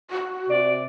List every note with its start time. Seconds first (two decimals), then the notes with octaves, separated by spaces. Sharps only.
0.11 F#4
0.49 C3 D5